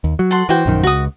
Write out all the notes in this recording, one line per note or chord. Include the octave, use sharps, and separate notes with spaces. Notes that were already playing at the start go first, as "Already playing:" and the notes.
D#2
F#3
A4 F#5 C6
E3 F#4 C5 G5
A#1 F#2 D#3
C#2 F#4 D#6